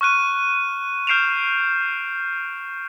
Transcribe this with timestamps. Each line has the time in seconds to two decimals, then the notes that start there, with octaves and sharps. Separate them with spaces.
0.01 C#6 F6 F#6 D#7
1.07 F6 G6 C7 D7 E7 F7